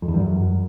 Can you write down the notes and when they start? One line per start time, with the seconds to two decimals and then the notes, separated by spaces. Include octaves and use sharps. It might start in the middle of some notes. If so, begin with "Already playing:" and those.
0.02 F2
0.08 E2
0.14 G2
0.20 F#2